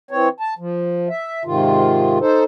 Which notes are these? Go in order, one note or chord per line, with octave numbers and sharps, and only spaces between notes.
E3 C4 C#5
A5
F3
E5
G#2 C3 D#3 F4
D#4 A4 C5